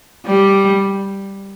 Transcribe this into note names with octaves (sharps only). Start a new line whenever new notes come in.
G3